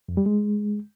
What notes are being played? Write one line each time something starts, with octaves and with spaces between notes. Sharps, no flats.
F2
G3
G#3